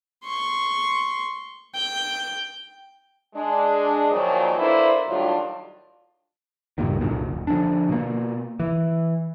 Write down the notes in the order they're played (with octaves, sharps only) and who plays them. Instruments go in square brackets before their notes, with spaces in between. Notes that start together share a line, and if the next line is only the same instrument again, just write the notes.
[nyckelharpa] C6 C#6
G5
[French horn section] G#3 D4
A#2 D#3 F3 F#3 G#3 A#3
A#3 D4 E4 A4 B4 C5
A2 D#3 F#3 G3 D4 F4
[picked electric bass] C#2 G2 A#2 D#3
C2 F#2 A#2 D3
D#1
D3 F3 C#4 D4
B2 A#3
E3